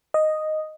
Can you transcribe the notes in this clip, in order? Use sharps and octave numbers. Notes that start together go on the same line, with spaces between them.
D#5